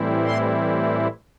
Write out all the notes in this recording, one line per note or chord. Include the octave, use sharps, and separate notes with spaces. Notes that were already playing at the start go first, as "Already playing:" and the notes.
Already playing: A2 E3 G3 C4 E4
C6